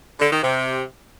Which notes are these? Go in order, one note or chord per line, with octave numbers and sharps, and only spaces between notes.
D3
D#3
C3